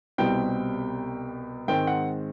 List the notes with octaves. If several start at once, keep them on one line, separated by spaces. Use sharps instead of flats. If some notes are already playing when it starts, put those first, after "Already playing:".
C2 B2 G3 C4 G5
G#2 D#3 G#3 C4 G5
F#5